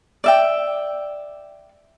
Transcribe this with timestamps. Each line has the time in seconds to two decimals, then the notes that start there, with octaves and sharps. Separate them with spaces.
0.24 D5 E5 G5